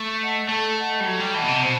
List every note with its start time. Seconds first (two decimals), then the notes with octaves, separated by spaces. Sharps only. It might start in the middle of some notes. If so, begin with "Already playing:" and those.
Already playing: A3
0.21 D#5 F#5 A5
0.49 A3 A4
0.77 D#5 F#5 A5
1.00 G3
1.05 F#3 A4
1.20 G3
1.34 E3 D#5 F#5 A5
1.42 B2
1.48 C3
1.62 B2 C5